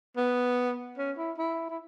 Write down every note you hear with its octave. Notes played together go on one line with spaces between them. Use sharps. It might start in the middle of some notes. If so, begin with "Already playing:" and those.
B3
C#4
E4
E4
E4